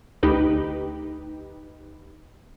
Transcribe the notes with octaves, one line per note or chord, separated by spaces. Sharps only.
D2 D#4 G4 B4